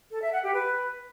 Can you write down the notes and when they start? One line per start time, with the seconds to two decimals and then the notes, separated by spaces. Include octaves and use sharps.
0.11 A4
0.22 E5
0.33 F#5
0.43 G4
0.54 B4